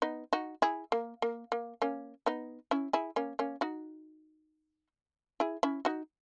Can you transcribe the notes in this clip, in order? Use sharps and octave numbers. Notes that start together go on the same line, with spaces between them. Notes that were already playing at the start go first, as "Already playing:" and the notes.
B3 D#4
D#4 F#4
E4 G#4
A#3
A#3
A#3
A#3 C#4
B3 D#4
C#4 E4
E4 G#4
A#3 C#4
A#3 C#4
D#4 F#4
E4 G#4
C#4 E4
D#4 F#4